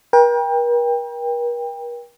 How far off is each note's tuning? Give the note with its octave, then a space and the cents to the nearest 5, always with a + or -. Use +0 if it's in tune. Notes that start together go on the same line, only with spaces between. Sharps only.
A#4 +45 G5 +25